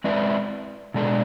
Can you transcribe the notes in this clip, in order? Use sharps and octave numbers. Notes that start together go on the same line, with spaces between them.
G#3 C4 E4 B4 D5
B2 G#3 D4 A4